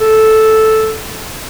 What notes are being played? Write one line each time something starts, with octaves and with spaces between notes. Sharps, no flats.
A4